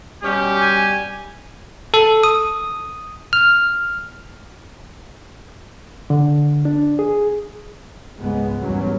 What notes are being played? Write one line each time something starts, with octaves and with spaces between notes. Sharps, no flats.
B2 G3 C#4 G4
G#5
A4
D#6
F6
D3
D4
G#4
C#2 G#2 G#3 B3
G#1 E2 F#3 G3 B3 C#4